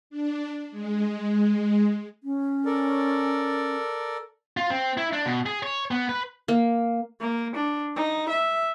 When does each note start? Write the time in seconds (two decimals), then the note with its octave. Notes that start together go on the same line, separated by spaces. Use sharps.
0.10 D4
0.71 G#3
2.24 C#4
2.66 A4 A#4 D5
4.57 F4
4.70 C4
4.98 E4
5.13 D4
5.26 B2
5.46 G#4
5.63 C#5
5.91 B3
6.09 B4
6.48 A#3
7.21 A#3
7.55 D4
7.96 D#4
8.29 E5